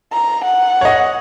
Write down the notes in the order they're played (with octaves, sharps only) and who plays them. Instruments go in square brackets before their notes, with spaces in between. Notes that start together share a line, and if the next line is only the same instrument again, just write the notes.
[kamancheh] A#5
F#5
[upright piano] C#5 D#5